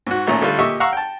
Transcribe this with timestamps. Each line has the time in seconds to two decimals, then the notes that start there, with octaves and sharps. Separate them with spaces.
0.07 G#2 F#4
0.27 G#1 A#2 A3 C#4 A#5
0.41 D3 G3 A3 F4 A4
0.59 A#2 G4 D#5 E5 C#6 E6
0.80 F5 F#5 A#5 C#6 E6
0.93 G5 A5